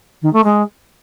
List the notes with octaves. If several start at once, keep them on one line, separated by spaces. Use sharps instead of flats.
D#3
A3
G#3